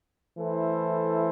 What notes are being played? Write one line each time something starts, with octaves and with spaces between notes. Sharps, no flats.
E3 A3 E4 A4 C5